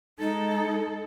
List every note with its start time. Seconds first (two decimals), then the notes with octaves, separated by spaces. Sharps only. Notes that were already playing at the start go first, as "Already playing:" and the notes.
0.19 G#3 D#4 A4